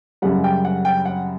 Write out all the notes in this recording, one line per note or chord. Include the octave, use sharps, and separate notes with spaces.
F#2 C#3 G3 F#5
G5
F#5
G5
F#5